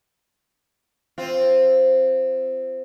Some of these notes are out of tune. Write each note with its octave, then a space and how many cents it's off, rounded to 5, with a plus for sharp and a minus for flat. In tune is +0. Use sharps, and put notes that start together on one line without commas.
C4 +0 F4 +0